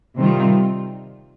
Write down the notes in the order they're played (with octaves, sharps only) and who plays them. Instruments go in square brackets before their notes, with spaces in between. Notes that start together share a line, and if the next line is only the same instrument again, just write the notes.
[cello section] C3 D#3 G3 C4 F4